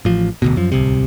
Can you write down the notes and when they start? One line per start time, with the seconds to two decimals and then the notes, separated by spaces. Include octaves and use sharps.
0.05 A1 F3
0.42 D1 D2 B2
0.56 F#2 F3
0.72 D1 C2 C3